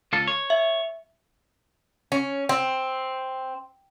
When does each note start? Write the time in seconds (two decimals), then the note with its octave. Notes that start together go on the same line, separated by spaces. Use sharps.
0.13 C#2 F4 A4
0.27 C#5
0.50 E5
2.12 C#4
2.49 C4